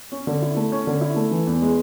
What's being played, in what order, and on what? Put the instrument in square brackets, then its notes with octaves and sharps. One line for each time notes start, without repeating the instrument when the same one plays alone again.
[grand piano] C#4
D3
E4
A3
C#4
D3
E4
A3
E3
E2
G#3